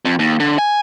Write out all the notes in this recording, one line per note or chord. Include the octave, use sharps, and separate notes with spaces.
F2
D#2
D3
G#5